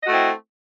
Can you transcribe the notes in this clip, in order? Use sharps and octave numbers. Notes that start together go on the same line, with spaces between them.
A3 C4 E4 F#4 D#5